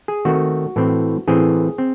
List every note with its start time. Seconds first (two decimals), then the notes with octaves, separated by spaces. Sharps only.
0.08 G#4
0.25 D#3 A3 C4 F#4
0.76 A2 E3 C4
1.28 A2 E3 C4 G#4
1.78 C4